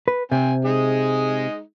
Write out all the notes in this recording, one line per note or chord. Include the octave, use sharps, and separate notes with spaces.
B4
C3 C4 G#5
G#3 D#4 G#4